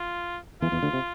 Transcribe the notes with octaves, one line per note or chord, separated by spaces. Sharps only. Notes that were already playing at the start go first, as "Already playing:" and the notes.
Already playing: F4
E2 E3 F4
E2 E3
D2 D3
C3